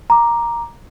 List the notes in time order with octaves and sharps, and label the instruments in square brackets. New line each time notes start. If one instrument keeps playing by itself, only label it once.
[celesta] A#5 D6